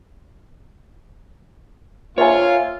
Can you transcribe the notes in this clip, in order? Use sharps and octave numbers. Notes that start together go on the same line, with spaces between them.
A#3 F4 C5 C#5 E5 G#5